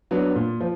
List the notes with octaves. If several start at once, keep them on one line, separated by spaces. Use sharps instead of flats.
F#3 B3 D4
A#2
F3